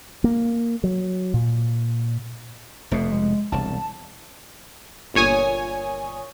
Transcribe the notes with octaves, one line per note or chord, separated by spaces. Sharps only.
A#3
F#3
A#2
F1 F2 B2 A3
G#3
E1 C2 A5
G1 A#2 C#5 G#5 D#6